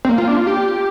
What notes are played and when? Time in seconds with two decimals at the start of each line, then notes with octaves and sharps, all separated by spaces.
0.05 C4
0.09 A#3
0.18 F4
0.28 D4
0.37 F4
0.47 G4